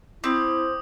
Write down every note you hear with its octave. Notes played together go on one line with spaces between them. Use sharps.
C4 E4 D6 D#6